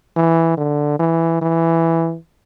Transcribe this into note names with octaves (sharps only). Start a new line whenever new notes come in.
E3
D3
E3
E3